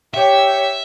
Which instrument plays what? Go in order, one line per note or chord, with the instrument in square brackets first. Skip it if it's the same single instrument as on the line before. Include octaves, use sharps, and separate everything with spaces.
[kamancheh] G4 C#5 [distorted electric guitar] E5